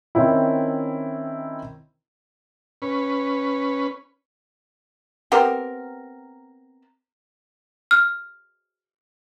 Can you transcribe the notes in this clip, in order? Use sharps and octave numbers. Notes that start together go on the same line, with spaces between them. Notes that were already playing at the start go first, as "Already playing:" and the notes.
D#3 C4 C#4 E4
C#4 B4
B3 C4 G4 A#4
F6